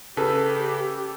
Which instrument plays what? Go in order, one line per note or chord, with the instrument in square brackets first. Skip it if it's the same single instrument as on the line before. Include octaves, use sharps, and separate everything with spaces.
[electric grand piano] C#3 B4 [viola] G4 [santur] A4